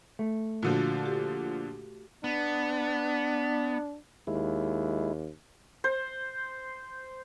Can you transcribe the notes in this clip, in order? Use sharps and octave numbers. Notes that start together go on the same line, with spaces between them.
A3
A#2 D3 F3 F#4
G4
B3 D4
D#2 G#3 E4
C5